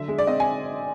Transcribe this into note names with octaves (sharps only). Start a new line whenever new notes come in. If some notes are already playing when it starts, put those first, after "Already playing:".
Already playing: D3 F#3 E5
G#3
D5
C4 D#5
G#5